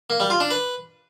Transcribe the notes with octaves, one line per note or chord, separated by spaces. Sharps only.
A#3
G3
F4
D4
B4